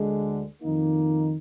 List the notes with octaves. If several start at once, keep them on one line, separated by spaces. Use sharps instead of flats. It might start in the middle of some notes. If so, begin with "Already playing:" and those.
Already playing: D2 D3 G#3
F2 D#3 A#3 D#4